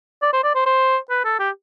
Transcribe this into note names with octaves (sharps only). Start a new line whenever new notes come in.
D5
C5
D5
C5
C5
B4
A4
G4